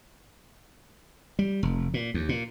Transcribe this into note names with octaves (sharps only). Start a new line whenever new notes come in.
G3
F1
A#2
D#2
A#2